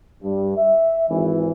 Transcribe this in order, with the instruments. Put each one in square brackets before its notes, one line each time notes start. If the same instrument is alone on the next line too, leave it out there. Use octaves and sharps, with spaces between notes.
[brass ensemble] G2
E5
G#1 E3